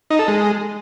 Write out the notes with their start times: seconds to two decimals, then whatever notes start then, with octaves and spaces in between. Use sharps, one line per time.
0.11 D#4
0.19 A4
0.28 G#3